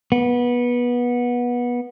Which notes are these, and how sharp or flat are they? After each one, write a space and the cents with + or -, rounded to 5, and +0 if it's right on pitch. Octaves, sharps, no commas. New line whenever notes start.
B3 -20